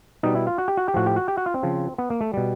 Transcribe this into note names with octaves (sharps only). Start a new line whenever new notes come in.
B2 G3 D#4
E4
F4
F#4
G4
F#4
G4
A2 F3 F#4
G4
F#4
G4
F#4
F4
C4
C#3 F3
B3
A#3
A3
B2 G3